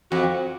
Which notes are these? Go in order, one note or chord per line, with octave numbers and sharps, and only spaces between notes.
F2 F#4